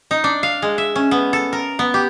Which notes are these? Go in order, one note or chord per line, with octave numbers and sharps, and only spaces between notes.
D#4
D4
F5
G#3
E5
C#4
B3
A4
A#4
B3
G4